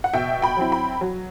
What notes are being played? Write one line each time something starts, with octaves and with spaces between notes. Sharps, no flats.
F#5
B2 E5 G5
G5 B5
F#3 C4 E4
G5 B5
F#3